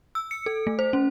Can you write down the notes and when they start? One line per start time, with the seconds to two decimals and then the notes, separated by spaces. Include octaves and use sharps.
0.15 E6
0.31 C#7
0.46 A4
0.67 A3
0.79 C5
0.93 C#4